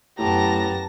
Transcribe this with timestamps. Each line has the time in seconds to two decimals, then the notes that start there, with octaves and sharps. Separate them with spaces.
0.19 F#2 A2 B3 G4 A5 A#5 A#6